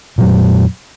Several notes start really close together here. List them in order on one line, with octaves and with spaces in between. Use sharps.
A#2 F#3 F2